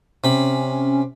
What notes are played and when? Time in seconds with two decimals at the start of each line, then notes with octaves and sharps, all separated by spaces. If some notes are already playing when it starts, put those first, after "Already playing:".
0.24 C3 C#4 B5